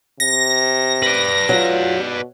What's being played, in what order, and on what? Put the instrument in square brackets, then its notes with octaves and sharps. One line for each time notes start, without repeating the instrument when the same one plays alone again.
[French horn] C3 [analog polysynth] A#6
[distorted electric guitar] B4 D5
[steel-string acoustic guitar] F#3 [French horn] F4
[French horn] B2